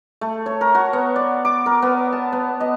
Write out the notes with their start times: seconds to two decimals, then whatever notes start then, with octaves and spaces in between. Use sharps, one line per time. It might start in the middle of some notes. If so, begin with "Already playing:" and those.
0.21 A3
0.46 C#5
0.61 A#4
0.75 F#4
0.93 B3
1.16 D5
1.45 D6
1.66 A#4
1.82 B3
2.13 A5
2.33 B3
2.60 D#5